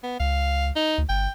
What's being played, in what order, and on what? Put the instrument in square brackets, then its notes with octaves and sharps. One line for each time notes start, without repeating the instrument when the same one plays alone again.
[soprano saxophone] B3
[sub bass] C#2 [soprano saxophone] F5
[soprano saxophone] D#4
[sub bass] D2
[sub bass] G1 [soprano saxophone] G5